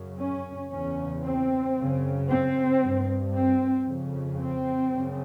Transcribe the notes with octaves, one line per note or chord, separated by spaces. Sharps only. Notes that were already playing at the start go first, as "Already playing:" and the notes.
Already playing: F#2 C#3
C#4
E2 C#3 C#4
C4
F#2 C#3
C4
G2
C4
F2 C#3
C4
F#2 C#3